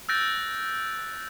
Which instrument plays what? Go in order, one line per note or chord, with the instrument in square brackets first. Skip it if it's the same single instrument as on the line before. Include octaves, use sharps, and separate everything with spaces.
[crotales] E6 F#6 G6 A6 A#6 D7